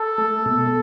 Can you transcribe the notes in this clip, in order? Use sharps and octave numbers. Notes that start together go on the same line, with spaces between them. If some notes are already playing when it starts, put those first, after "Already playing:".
Already playing: A4
A3
B2